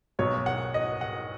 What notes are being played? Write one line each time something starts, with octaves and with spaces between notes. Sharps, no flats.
B1 B2 F#3 C#5
F#5
D#5
F#5